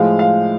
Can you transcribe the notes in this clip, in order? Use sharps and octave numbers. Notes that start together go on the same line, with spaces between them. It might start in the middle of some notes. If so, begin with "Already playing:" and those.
Already playing: A2 F3 G#3 F5
F5